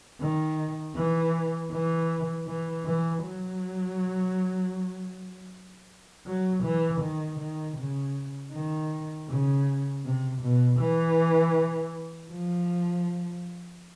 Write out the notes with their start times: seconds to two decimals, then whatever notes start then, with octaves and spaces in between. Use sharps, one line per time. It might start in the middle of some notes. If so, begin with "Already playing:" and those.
0.21 D#3
0.96 E3
1.72 E3
2.47 E3
2.86 E3
3.24 F#3
6.26 F#3
6.64 E3
7.02 D#3
7.40 D#3
7.77 C#3
8.53 D#3
9.29 C#3
10.05 C3
10.42 B2
10.80 E3
12.32 F3